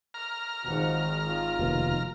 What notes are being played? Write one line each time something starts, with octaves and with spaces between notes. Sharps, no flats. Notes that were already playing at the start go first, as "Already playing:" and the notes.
A#5 F6
G#1 G#2 D#3 F3 F#4
F4
F1 D#2 B2